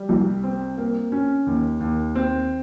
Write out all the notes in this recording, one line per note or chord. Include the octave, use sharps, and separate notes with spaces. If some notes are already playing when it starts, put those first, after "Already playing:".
Already playing: G3
C2
C4
A#3
C#4
D#2
D#2
C4